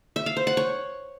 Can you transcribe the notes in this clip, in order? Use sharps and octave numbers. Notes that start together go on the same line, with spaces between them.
E5
F5
C5
F#5
C#5